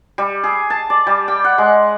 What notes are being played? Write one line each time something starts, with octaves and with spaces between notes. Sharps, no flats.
G3
G#4
A5
D5
G3
G5
F#5
G#3